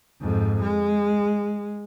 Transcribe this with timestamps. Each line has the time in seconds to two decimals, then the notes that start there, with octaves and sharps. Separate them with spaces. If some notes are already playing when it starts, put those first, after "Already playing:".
0.21 F2 G#2
0.62 G#3